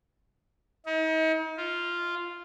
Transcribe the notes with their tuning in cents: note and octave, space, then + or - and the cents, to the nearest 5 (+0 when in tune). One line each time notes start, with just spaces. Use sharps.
D#4 +40
F4 -5